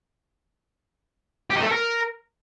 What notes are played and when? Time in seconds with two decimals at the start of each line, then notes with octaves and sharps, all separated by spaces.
1.50 G4
1.55 D#4
1.61 A3
1.66 A4
1.71 A#4